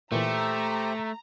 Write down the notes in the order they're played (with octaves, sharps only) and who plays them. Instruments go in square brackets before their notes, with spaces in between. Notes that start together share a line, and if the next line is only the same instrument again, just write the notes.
[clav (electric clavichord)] A#2 E3 [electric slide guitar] A3 [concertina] G4 C5 E5 [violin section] A#5